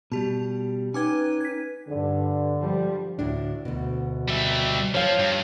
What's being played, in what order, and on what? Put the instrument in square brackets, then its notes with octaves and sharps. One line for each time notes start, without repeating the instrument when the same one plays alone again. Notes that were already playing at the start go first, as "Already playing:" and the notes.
[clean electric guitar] B2 G3 [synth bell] G4 A5
[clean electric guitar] C#4 G5 [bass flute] D#4 [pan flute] B4 [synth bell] G#5 D6 G#6
[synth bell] G#6 B6
[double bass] G2 [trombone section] D3 D4
[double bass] F3 G3
[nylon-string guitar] D2 A2 D4
D2 B2
[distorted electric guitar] G3 E5
[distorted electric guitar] F3 [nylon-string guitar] C#5 F5
[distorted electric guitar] G2